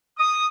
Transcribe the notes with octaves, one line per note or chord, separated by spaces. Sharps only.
D#6